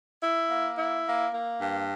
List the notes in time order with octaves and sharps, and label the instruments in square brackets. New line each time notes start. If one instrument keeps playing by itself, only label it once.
[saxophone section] E4
A#3
E4
A#3
A#3
G2